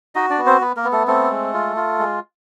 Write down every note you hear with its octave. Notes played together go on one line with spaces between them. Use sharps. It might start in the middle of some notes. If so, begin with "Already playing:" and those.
D#4 F#4 D#5
D4 D5
B3
C4 C5
B3 B4
A#3 A#4
B3
A3 A4
A3 C4 A4
G#3
F4
F4
G#3